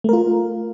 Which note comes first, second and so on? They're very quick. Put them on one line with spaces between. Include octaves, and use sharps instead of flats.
A3 A#4 F4